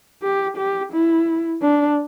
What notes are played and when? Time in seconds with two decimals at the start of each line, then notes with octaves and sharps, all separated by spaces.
0.23 G4
0.57 G4
0.93 E4
1.62 D4